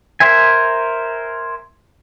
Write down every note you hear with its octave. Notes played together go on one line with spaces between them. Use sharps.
A#4 C5 E5 G#5